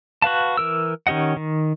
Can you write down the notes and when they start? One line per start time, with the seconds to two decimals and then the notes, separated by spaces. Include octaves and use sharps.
0.22 F#4 B4 F5 A5
0.57 E3 A#4 E6
1.07 D#3 C#4 G4 D#5 F#5
1.37 D#3